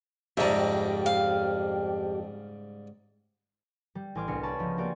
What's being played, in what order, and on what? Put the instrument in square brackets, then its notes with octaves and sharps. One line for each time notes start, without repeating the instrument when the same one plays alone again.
[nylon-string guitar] F2 [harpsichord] G#2 C#3 G3 [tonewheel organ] G4 [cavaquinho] E5 A#5
[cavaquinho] F5
[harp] G3
A1 G#5 C6 D6 F6
C2 B3 D4 A#6 C#7
C#5 D5 G#5 A5 B5 C#6
C#2 F3 D#5 B6
A#3 C4 F#4 G4 D5 G#5